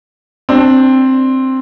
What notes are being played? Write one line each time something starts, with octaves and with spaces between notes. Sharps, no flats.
C4 D4